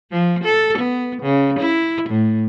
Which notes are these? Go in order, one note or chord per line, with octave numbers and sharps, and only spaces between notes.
F3
A4
B3
C#3
E4
A2